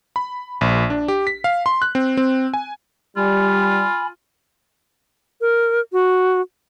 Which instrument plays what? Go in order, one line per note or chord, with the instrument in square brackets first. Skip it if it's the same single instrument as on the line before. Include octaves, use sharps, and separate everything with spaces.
[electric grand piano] B5
A#1
D4
G4
B6
F5
C6
F#6
C4
C4
G#5
[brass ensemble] G3 [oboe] F4 [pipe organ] G#5 B5
[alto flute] A#4
F#4